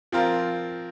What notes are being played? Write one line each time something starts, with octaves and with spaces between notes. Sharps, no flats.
F3 C4 F4 A#4